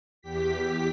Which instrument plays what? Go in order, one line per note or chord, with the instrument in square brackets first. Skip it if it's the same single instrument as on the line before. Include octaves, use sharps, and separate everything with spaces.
[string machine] E2 G4 B6